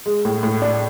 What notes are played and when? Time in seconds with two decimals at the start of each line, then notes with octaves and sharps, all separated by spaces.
0.06 G#3
0.25 A2
0.43 A2
0.62 D4